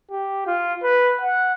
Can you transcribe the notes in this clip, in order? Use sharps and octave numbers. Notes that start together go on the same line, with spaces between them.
G4
F4
B4
F#5